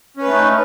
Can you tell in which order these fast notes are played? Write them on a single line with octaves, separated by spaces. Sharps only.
C#4 B4 A3 D#4